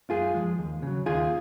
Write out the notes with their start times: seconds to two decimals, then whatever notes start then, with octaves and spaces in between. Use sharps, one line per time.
0.10 F#2 F4 G#4
0.34 F3 G#3
0.59 D#2
0.82 C#3 F#3
1.06 D#2 F4 G#4